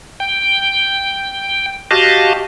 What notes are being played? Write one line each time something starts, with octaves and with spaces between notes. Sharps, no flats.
G5
F#4 G4 D#5 F5 A5